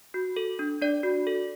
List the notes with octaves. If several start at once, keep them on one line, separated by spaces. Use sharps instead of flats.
F#4
A4
D4
D4 D5
F#4
A4